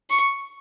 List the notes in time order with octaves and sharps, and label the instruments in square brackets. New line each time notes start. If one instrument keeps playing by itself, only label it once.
[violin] C#6